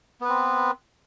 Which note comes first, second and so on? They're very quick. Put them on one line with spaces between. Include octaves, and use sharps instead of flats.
B3 B4 C4